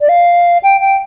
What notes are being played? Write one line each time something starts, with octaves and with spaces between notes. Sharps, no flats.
D5
F5
G5
G5